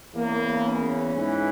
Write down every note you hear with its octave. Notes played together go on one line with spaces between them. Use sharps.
E2 C#3 E3 A#3
C#4
G#2 E3